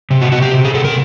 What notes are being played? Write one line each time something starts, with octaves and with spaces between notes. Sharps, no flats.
C3
F#4
C3 F#4
G4
C3
G#4
C3 A4
A#4